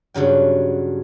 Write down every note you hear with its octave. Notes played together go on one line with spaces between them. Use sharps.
G2 C#3 F#3 G5